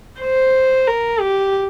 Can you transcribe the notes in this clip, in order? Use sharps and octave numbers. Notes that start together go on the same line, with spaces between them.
C5
A#4
G4